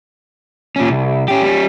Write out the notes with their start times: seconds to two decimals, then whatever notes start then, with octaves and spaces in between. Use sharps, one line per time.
0.76 A#2 C#4
0.90 C2
1.28 C#4 G4
1.42 G3 C#4